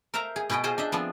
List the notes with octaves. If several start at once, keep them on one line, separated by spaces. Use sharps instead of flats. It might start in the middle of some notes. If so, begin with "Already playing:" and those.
A#4 C5 E5 F5 A#5
G#4
B2 G#4 B4 D#5 G5
F4 G#4 C5 D#5 A5
D4 D#5 E5
F3 B3 C4 D4